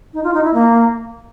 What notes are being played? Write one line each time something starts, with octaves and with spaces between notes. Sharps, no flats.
D#4
F4
D#4
E4
A#3